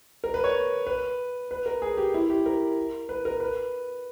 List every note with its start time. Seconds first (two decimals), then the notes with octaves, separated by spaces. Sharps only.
0.24 A#4
0.34 B4
0.44 C#5
0.87 B4
1.51 B4
1.66 A#4
1.82 G#4
1.97 G4
2.14 E4
2.30 G4
2.46 A#4
3.09 B4
3.25 A#4
3.40 B4